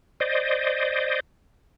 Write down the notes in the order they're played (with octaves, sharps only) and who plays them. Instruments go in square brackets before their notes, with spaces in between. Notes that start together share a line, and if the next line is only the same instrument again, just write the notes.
[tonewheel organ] C5 D5 D#5